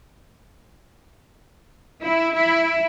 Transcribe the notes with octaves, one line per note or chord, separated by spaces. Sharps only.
E4
E4